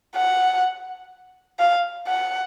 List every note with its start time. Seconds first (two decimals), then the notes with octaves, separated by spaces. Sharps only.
0.16 F#5
1.59 F5
2.07 F#5